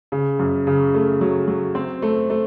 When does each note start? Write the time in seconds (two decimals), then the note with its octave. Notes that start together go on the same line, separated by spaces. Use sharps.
0.12 C#3
0.39 F#2
0.67 C#3
0.94 A3
1.21 F#3
1.48 F#3
1.75 C4
2.02 A3
2.30 A3